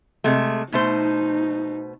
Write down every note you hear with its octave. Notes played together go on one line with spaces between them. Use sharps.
C3 G#3 A3
B2 A3 D#4 C5